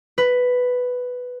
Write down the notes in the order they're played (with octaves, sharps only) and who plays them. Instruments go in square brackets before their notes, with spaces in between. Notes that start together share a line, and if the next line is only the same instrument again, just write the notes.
[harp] B4